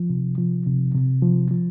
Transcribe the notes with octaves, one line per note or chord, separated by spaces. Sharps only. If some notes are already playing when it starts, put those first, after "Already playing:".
Already playing: F3
C3
F3
C3
C3
F3
F3